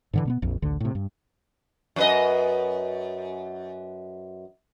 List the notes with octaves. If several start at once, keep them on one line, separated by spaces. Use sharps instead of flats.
G#2 D3 E3
B2 A#3 B3
A#1 F2
A1 D2 D3
A2 C3
G2
F#2 B4 D#5